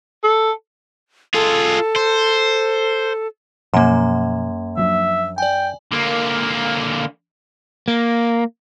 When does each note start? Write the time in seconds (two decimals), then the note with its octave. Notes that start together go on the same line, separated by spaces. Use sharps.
0.24 A4
1.34 F4 G#4 A4
1.96 C5
3.74 F#2 B2 F3 A#3 C6
4.77 F3 F#3 D4 E5
5.38 D5 G5 G#5
5.92 D3 A#3
7.88 A#3